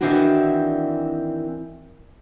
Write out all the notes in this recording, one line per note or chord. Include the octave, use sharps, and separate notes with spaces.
D#3 E3 C4 D4 E4 F#4